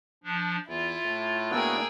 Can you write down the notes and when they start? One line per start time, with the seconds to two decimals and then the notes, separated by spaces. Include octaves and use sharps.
0.24 F3 D4
0.68 E2 E4 F4
1.05 A2
1.51 A#3 B3 D4 F#4 G#4 G5 E6